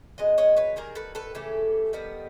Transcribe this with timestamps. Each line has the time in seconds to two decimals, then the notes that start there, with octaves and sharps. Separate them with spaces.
0.18 B2 G#3 B3 D#5
0.38 C#5 D#5
0.57 B4 C#5
0.76 D#3 G3 A#3 G#4 A#4
0.95 A4 B4
1.15 A4 B4
1.35 C#3 E3 A3 G4 A4
1.93 D#3 G3 B3